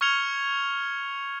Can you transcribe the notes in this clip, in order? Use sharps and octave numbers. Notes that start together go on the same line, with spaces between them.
C#6 F6 G#6 C#7 F7 G7